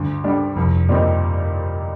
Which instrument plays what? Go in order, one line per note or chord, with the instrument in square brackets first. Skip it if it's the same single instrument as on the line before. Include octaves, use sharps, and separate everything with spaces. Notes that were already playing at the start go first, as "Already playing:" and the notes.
Already playing: [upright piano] D2 [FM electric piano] G2
[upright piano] D3 G3 D4
[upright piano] C2 [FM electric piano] F2
[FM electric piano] G2 [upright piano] A#2 G3 C4 D#4